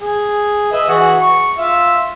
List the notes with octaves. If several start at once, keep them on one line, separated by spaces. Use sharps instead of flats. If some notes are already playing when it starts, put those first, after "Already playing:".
G#4
B4 D#5 E5
E3 F#4 G#4
C#6
F4 E5